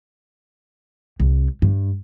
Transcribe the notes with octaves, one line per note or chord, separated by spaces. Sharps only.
C2
G2